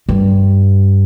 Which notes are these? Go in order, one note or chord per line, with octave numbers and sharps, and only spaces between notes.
G2